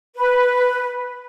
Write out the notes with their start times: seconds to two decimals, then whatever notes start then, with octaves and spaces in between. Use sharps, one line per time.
0.15 B4